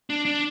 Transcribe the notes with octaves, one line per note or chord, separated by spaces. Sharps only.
D4
D4